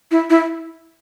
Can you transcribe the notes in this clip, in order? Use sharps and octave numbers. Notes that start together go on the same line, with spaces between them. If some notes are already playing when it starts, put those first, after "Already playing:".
E4
E4